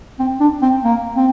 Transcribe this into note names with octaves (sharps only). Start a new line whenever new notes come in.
C4
D4
C4
A#3
C4